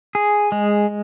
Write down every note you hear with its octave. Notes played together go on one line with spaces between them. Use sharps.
G#4
G#3